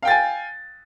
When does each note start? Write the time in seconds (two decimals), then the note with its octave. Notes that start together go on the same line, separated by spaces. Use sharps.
0.02 F5
0.05 G5
0.08 A6
0.10 G#5